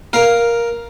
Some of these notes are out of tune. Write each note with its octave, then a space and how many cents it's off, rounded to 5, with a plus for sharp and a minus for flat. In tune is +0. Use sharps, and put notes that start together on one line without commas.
A#4 +10 F5 +0